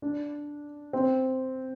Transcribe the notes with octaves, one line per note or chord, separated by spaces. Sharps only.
D4
C4